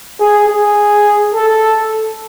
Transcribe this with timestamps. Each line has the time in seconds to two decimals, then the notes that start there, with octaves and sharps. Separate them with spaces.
0.20 G#4
0.48 G#4
1.34 A4